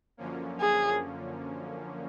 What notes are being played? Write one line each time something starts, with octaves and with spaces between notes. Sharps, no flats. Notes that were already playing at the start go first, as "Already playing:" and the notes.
F#2 D3 F3 A#3 C#4
G#4